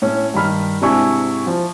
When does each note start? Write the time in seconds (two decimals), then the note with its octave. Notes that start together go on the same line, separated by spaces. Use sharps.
0.02 A2 C#4
0.34 G2 D#3 B5 F6
0.81 G#2 C3 D4 E4 G#5 C#6
1.47 F3